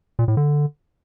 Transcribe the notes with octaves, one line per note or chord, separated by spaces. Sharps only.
A#2
A2
D3